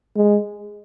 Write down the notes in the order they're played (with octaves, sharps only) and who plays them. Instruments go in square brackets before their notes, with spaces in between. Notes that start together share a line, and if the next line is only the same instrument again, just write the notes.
[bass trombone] G#3